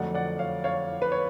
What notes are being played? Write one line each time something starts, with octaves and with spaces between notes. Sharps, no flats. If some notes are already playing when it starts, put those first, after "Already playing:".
Already playing: F2 D3 F#3 A3 D5 F#5
D5 F#5
C#5 F5
C#5 F5
B4
C#5